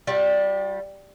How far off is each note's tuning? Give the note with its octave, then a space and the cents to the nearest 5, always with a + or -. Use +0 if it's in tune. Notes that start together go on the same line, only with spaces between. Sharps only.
G3 +0 F4 +45